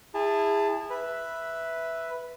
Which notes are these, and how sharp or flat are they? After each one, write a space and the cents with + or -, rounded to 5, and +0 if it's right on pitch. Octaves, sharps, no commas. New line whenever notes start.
E4 +0 G#4 -25 A5 +5
B4 +0 E5 +0